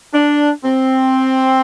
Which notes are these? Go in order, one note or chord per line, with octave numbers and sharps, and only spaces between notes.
D4
C4